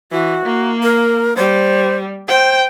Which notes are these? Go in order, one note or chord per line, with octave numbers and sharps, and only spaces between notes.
E3 F#4
A#3
A#4
G3 C5
C5 G5